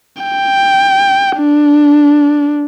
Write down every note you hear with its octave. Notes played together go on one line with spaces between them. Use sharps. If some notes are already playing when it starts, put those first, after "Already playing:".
G5
D4